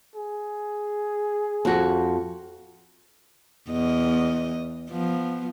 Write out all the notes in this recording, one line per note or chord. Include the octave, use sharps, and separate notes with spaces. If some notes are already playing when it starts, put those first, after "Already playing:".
G#4
F2 F#4
E2 D#5
F3 B3